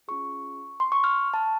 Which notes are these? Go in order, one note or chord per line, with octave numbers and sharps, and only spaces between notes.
C#4 F4 G#4 C#6
C6
C#6
F6
A5